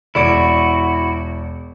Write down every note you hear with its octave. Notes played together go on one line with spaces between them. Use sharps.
E1 E4 F#4 D5 D7